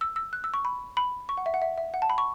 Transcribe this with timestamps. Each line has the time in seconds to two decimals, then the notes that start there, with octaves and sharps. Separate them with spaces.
0.01 E6
0.16 E6
0.33 F#6
0.44 E6
0.54 C#6
0.65 B5
0.97 B5
1.29 C#6
1.37 F#5
1.46 E5
1.54 F#5
1.62 E5
1.78 E5
1.94 F#5
2.02 A5
2.10 B5
2.18 C#6